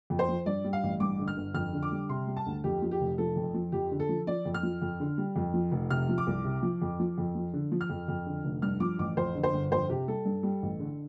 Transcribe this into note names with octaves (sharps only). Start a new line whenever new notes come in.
F2
C5
F3
G2 D5
G3
F5
A1
G2 D6
D3
F6
G1
F2 F6
D3
D6
G3
C3 C6
G3
A5
D2
F2 G4
F3
G4
F1
F3 A4
F2
F3
F2 G4
D3
A4
F3
F3 D5
F2
F6
F3
F2
D3
G3
F2
F3
F1
C3 F6
F3
D6
C2
C3
F3
F2
F3
F2
F3
D3
F3
F6
F2
F2
D3
F1
G2 F6
F3 D6
A1 D6
F2 C5
D3
C5
G1
F2 C5
C3 G4
G3 A4
G2
G3
A1
D3